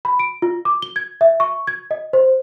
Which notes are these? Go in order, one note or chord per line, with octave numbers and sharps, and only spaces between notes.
B5
D7
F4
D6
G7
G#6
E5
C#6
G#6
D#5
C5